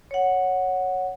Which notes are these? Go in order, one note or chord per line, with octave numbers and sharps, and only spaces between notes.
C#5 F#5